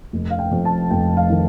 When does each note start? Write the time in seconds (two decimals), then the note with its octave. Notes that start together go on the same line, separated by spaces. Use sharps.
0.13 F1
0.30 F5
0.39 G5
0.51 F2
0.65 A5
0.91 F1 G5
1.17 F5
1.30 D#3